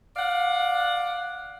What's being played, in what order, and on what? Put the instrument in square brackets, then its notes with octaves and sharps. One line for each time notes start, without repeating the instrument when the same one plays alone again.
[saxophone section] D5 F5 F#5